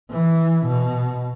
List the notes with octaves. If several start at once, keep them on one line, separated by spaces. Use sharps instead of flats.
E3
B2